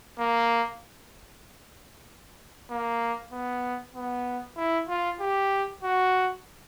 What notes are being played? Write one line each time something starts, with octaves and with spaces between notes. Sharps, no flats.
A#3
A#3
B3
B3
E4
F4
G4
F#4